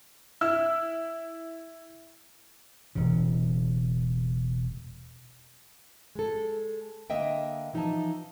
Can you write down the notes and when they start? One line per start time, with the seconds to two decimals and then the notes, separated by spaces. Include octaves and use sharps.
0.41 E4 E6
2.95 E1 C#3
6.15 G#3 A4
7.10 D3 A#3 D#5 E5 G5
7.73 E3 F3 D#4 A4 E5 A5